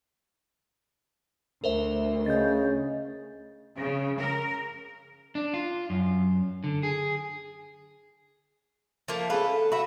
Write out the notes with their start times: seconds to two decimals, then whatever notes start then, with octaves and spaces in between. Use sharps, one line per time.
1.64 D2 A#4 C5 E5
2.26 C#3 D#5 G6 A6
3.77 C#3
4.18 A#4
5.35 D4
5.54 F4
5.90 F#2
6.64 D3
6.83 G#4
9.08 F3 A3 A#3
9.30 C#4 G#4 A4 B4 F5
9.72 F#4 E5 B5